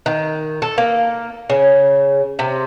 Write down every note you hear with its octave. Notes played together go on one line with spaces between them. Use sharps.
D#3
A4
A#3
C#3
C3